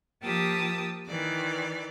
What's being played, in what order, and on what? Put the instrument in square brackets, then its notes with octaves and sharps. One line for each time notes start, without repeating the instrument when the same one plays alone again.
[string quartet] F3 A#3 G4 A5 D#6 E6
D#3 E3 D5